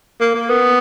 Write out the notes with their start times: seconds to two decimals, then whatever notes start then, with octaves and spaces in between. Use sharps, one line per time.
0.21 A#3
0.34 A#3
0.50 B3